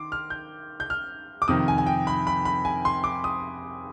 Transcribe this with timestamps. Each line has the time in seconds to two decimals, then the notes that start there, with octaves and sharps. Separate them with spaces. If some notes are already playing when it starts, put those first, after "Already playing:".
Already playing: D#3 C6 D6
0.12 F6
0.30 G6
0.80 G6
0.90 F6
1.42 D6
1.48 F2 C3 D#3 D#6
1.68 G#5
1.78 G#5
1.87 G5
2.07 B5
2.27 B5
2.45 B5
2.65 G#5
2.85 C6
3.04 D6
3.24 D#6